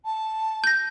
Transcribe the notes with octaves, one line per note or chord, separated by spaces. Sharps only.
A5
G6 A#6